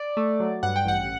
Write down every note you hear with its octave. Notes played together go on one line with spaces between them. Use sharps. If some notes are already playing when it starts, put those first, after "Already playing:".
Already playing: D5
A3
F#3
G2 F#5
G5
A1 F#5